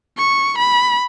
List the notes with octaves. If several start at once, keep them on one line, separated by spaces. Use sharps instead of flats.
C#6
B5